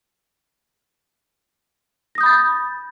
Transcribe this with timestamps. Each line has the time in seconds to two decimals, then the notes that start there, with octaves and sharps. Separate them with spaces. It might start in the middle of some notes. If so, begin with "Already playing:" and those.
2.15 A#6
2.18 D#6
2.21 G6
2.23 B5
2.26 A6